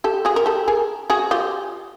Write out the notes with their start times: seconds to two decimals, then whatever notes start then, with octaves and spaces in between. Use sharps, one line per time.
0.04 G4 A4
0.25 F#4 G#4
0.36 A#4
0.46 G4 A4
0.68 G#4 A#4
1.10 F#4 G#4
1.31 F4 G4